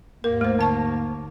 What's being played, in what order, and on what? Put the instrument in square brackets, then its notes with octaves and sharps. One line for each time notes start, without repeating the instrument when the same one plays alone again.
[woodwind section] D#2 G#2 A#3 [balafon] A#4
[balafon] A3 C5
D3 A5 C#6